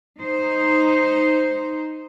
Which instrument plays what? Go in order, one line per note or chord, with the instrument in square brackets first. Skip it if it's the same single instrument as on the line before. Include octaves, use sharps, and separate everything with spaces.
[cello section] D#4 C5